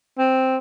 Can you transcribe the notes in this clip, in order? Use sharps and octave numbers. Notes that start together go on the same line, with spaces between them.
C4